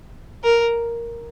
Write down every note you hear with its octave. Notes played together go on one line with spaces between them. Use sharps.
A#4